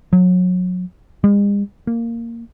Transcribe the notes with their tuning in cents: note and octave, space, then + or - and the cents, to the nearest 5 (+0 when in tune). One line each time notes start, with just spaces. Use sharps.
F#3 -30
G#3 -45
A#3 -10